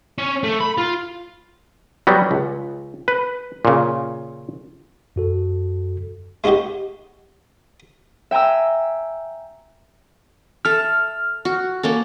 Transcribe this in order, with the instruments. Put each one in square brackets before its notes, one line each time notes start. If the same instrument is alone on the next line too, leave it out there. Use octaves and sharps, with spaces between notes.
[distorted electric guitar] C#4
A3
B5
F4
[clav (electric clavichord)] F#3 G3 B3
C#2
B4
A#2 C#3
[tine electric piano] F#2 F#4 A4
[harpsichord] G#3 C#4 D#4 F#4 G4
[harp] E5 G5 G#5 A#5 E6
[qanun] A4 E5 [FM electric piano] F6
[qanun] F#4
A#3 C#4 A4